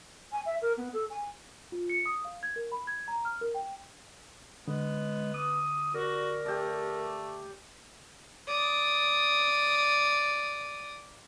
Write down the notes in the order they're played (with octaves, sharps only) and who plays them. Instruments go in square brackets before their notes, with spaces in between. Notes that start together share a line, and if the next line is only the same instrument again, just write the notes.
[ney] G#5
E5
A#4
B3
A4
G#5
[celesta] F4
C#7
D#6
F5
G#6
A#4
B5
G#6
A#5
F6
A#4
G5
[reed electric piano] D3 [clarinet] G#3 [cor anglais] B3
[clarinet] D#6
[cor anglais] F#4 [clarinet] A#4 [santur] D5
[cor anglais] A3 [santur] G4 D5
[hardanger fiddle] D5 D#6